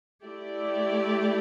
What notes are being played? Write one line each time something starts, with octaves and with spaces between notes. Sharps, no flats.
A3 E4 G4 D5